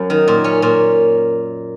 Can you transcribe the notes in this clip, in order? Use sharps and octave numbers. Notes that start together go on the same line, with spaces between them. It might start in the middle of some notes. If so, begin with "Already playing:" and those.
Already playing: F#2 F#3
D#3
A#2
C#4
A#2